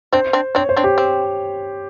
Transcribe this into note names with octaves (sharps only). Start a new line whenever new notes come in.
C4 D4 C5
C4 D4
C4 D4 C#5
C5
C4 D4
G4
C4